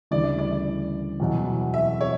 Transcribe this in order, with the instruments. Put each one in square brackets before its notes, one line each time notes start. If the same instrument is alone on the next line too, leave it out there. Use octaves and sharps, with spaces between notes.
[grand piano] D2 C#3 E3 G3 [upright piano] D5
[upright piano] D5
[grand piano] E2 B2 F#3
[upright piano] E5
C#5